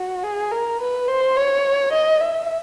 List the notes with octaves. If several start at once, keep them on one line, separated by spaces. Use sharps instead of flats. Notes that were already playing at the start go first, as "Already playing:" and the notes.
Already playing: F#4
G#4
A#4
B4
C5
C#5
D#5
E5